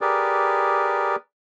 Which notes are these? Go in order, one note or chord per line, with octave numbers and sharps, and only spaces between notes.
G4 G#4 A#4 B4 D5